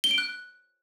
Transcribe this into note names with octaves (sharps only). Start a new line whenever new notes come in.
G7
D7
F#6